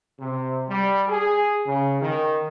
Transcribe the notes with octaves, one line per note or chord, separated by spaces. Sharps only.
C3
G3
G#4
C#3
D#3